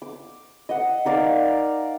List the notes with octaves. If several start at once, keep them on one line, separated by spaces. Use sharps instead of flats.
D6
D#5 F#5
D#4 A#4 D5 F5